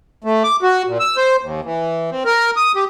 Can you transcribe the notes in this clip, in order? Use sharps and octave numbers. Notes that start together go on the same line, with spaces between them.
A3
D6
F#4
A#2
E6
C5
D#2
E3
C4
A#4
D#6
G4